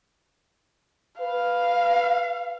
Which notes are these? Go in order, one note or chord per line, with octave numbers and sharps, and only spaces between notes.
B4 F5